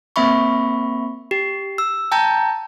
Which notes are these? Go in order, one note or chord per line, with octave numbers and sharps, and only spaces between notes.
A#3 C4 E5 B5 C#6
G4
E6
G5 A5 A#5 G6